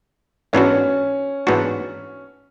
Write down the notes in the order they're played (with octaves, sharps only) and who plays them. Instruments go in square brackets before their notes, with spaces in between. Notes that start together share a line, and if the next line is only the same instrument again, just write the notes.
[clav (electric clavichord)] G#2 E3 B3 D4 F#4 [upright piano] C#4
[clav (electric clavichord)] G#2 E3 B3 D4 F#4